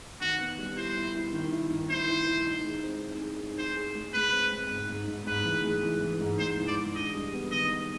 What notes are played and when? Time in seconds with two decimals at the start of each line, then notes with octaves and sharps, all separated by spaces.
0.21 D#3 F#4
0.39 B3
0.58 G3
0.77 E4 C5
0.96 E4
1.15 E4
1.33 D#3
1.52 E4
1.71 D#3
1.90 E4 C5
2.08 E4
2.27 E4
2.46 D#4
2.64 G#3
2.83 C4
3.01 D#4
3.21 G#4
3.40 D#4
3.58 D#4 C5
3.76 G#4
3.95 G#3
4.14 G#3 B4
4.32 C4
4.52 G#3
4.71 G#2
4.89 G#2
5.08 G#2
5.27 G#2 B4
5.45 E3
5.64 G#3
5.83 E3
6.01 E3
6.21 G#2
6.38 G#3 C5
6.57 E3
6.68 D5
6.77 G#3
6.95 D4 D#5
7.14 G3
7.33 B3
7.51 D#3 D#5
7.70 B3